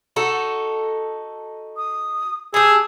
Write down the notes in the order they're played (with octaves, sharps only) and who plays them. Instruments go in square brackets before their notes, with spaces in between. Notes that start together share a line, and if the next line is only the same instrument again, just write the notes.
[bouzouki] D#4 F#4 A4
[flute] D#6
[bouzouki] G4 A5 [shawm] G#4 [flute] E6